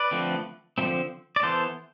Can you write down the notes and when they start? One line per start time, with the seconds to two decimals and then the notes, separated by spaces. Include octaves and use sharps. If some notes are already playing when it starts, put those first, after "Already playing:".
Already playing: B4 D5
0.11 D3 F3 A3 C4
0.78 D3 F3 A3 C4
1.36 D5
1.43 E3 B3 A4 C5